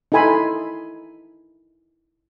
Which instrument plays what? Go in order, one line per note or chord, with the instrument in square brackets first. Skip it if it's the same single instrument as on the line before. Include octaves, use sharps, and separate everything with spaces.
[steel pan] D#4 E4 A4 G#5 B5 C6